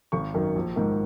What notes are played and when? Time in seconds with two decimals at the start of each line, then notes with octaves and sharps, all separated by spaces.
0.12 G#1 C#6
0.34 F#2 D#3
0.56 A#1
0.76 G#2 D#3